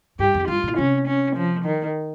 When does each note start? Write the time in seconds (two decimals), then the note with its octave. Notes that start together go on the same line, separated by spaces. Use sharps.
0.19 G2 G4
0.34 F2
0.48 G2 F4
0.63 A#2
0.77 C3 C#4
1.07 C#4
1.36 F3
1.65 D#3